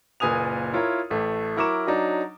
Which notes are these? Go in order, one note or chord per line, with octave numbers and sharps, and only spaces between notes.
F#1 A#2 B4 G#5 D#6 F7
E4 F4 A#4 C#5
A1 A3
F#3 E4 A#4 C#6 D6 E7
F#3 D4 D#4